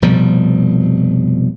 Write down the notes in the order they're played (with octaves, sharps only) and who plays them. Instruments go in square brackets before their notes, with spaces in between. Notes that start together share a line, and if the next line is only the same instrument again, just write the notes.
[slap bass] F1 B2 F3 G3